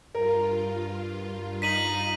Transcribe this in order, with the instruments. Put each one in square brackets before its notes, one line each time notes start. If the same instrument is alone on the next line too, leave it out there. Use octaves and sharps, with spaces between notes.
[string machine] G2 F4 [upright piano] A#4
[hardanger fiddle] D#4 [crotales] B6 D#7 F#7